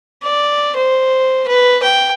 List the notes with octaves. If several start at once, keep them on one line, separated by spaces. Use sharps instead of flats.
D5
C5
B4
G5